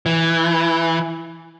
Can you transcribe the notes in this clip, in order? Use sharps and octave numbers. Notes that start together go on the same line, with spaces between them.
E3